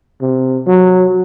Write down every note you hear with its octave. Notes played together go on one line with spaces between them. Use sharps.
C3
F#3